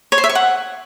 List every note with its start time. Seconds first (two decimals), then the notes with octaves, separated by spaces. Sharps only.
0.12 C#5
0.18 C5
0.24 E5
0.29 C#6
0.35 F#5